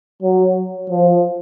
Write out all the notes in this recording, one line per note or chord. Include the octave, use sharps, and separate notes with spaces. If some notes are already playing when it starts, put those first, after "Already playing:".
F#3
F3